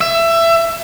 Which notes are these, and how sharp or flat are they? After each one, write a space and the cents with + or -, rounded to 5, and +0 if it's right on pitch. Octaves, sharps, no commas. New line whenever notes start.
E5 +20